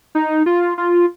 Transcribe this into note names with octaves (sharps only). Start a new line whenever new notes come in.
D#4
F4
F4